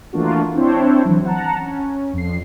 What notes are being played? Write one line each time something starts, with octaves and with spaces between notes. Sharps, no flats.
E3 A3 A#3 D4 F4 F#4
C4 D4 E4 C5 C#5
E3 F#3
F#5 A5 A#5
C#4
F2 C7